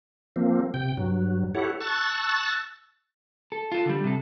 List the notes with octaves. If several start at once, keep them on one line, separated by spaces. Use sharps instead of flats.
F3 A#3 C4
C3 G5
G2 F#3
E4 G4 A4 C#5 F#5
A5 C#6 E6 F#6 A6
A4
F4 A4
D3 G3
C3 A4